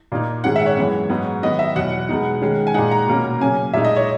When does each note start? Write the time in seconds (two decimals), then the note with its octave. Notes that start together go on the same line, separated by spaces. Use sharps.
0.12 A#2 A#3 D#4
0.44 G#2 D#3 G#3 C#4 F#5
0.56 E5
0.66 C#5
0.77 F#2 E3 G#3 B3
1.09 G#2 F#3 B3 D#4
1.43 D#3 F#3 B3 D#5
1.59 E5
1.75 E2 B2 F#3 F#5
2.09 B2 G#3 B3 D#4
2.41 D#3 G#3 C#4
2.67 G#5
2.74 A#2 G#3 D#4 F#5
2.91 A#5
3.08 B2 A#3 C#4
3.40 C#3 F#3 A#3 C#4 G#5
3.73 A#2 G#3 D#4 E5
3.85 D#5
3.96 C#5